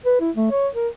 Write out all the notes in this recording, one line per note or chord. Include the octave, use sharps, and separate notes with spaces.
B4
E4
A3
C#5
A#4